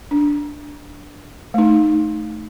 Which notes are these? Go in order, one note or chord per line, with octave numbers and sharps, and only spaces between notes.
D4
A3 D#4